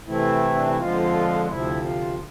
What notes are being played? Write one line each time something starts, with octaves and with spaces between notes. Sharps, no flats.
C3 E3 A3 C4 E4
D4
E4
F2 D3 F3 G#3 F4
D2 C3 F3 E4
F4